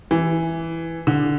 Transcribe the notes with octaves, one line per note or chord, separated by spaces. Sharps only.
E3
D3